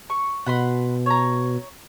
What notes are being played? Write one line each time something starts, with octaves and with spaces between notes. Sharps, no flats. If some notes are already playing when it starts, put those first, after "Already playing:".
C#6
B2 F#5 B5 C6
C#5 A#5